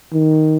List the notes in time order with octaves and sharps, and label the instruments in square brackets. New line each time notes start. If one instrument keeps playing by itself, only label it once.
[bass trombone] D#3